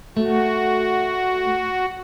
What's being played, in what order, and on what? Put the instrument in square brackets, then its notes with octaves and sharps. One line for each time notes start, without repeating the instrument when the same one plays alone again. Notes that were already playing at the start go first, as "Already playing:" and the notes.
[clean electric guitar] A3 [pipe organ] F#4